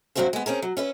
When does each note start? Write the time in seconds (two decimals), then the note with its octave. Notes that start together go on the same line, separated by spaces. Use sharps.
0.16 G2 F#3 C4 E4 F#4 C5
0.33 G#3 B3
0.46 C4 C#4 G#4 A#4
0.62 F#3
0.77 C#4 E4 B4